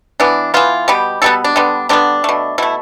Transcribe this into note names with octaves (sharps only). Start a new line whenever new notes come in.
E3 B3 D4
E3 B3 F4
B2 G3 B3 G4
B2 G3 B3 A4
D4
D3 G3 B3
D3 G3 B3 D4
B2 A3
B2 A3 E4